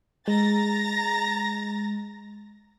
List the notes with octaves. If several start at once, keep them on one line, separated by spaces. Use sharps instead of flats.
G#3 A#5 A6 A#6